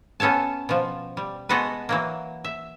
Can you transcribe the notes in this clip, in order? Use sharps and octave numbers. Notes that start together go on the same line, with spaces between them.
B3 C#4 A4 C#5 A5
B2 F3
G3
G#3 B3 F#4 A4 B4
E3 F#3 A#3
E5